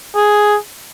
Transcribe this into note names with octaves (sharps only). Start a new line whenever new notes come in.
G#4